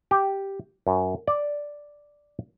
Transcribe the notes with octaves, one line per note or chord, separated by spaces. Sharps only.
G4
F#2
D5